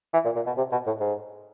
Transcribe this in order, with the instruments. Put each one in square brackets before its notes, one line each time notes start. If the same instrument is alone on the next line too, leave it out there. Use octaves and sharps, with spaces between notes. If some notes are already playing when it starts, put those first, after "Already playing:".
[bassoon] E3
A#2
A#2
B2
C3
B2
A2
G#2